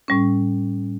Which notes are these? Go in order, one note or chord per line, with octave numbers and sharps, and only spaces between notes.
A2 G3 C#4